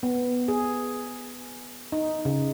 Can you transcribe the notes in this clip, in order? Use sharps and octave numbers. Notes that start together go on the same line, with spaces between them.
B3
G#4
D#4
C#3